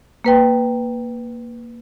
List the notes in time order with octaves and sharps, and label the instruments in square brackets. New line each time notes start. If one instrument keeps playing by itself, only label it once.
[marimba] A#3 B4 G5